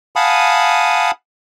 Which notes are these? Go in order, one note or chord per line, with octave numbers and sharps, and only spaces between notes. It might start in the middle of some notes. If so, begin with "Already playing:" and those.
F5 F#5 G#5 A5 B5 D#6